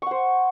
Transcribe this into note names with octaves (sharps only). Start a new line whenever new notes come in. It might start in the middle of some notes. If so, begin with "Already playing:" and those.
C5 F#5 C#6